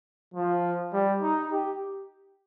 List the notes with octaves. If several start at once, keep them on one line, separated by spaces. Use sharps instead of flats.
F3
G3
D#4
G4